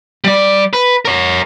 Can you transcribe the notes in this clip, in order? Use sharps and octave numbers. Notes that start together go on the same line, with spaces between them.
G3 D5
B4
A#4 C#5